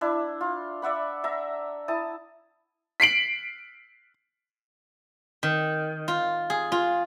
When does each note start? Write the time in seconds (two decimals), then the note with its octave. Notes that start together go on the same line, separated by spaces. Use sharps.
0.01 D4 E4
0.41 F4
0.82 D5 E5 F#5 B5
1.24 E5 A#5
1.88 E4 A5 D#6
3.00 B6 C7 D7 F#7
5.43 D#3
6.08 F4
6.50 G#4
6.72 F4